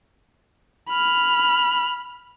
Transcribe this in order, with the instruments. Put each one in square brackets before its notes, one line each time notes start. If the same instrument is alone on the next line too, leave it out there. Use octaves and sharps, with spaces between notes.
[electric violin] B5 F6